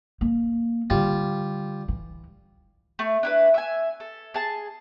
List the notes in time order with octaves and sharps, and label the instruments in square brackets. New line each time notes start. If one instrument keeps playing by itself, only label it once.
[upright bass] A#3
[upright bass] D3 E3 [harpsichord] G3 F4
[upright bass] E3
[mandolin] A3
D4 E4 B4
E5 G#5
A4
G#4 A5